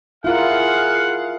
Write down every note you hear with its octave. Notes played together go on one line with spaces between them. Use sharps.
E4 F4 G#4 A#4 F5 F#5